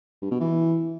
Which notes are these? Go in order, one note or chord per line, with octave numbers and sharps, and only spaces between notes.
G2
B2
E3